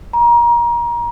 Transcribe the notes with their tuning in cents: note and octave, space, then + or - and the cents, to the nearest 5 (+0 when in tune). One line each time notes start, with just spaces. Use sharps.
A#5 +25